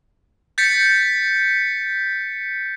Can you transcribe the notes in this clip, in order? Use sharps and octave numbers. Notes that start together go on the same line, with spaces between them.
G6 A6 B6 C#7